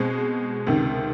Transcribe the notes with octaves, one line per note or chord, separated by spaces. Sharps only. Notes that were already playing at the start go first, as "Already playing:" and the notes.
Already playing: B2 G#3 C4
C#2 C3 D#3